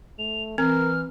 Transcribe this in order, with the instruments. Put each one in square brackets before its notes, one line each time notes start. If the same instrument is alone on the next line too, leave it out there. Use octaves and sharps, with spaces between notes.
[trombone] A3 [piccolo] F7
[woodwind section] E3 [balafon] C4 [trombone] A#4 [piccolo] F6